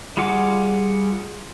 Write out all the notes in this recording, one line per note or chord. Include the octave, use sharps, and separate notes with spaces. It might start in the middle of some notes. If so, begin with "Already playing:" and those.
G3 F4 G#4 F#5 D6